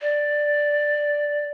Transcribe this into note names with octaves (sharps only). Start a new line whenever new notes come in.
D5